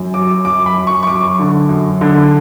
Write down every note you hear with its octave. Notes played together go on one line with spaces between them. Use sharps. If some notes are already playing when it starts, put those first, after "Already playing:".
Already playing: F#2
F#3 D6
F#2 D6
B5
F#2
C#6
C#6
F#2 D6
D3
F#2
D3